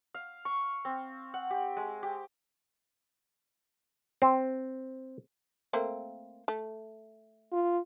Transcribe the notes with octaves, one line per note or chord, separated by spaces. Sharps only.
F5
C#6
C4
F#5
G4
G#3
G4
C4
A3 A#3 C4
A3
F4